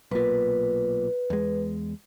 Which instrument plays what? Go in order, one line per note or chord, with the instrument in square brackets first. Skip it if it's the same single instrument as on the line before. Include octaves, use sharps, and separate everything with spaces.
[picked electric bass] B1 A#2 [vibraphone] B4
[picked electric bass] E2 G#3